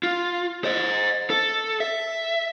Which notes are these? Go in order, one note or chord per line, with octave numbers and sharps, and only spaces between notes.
F4
C5 D#5
A4
E5